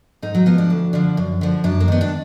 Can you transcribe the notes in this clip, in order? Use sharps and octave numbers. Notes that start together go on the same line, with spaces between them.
G#2 D#4
F#3
F3 B3
D4
D2
D3 F3
F#2
D3 F3
F#2 D4
A#3
D#3 B3
D4